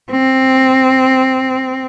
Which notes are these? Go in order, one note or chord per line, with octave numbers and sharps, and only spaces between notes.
C4